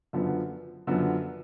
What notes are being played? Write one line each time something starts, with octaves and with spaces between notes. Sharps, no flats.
F#2 D3 F3 B3
F#2 D3 F3 B3